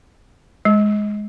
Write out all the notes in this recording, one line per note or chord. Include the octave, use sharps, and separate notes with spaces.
G#3